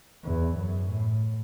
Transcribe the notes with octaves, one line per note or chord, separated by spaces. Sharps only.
E2
F#2
A2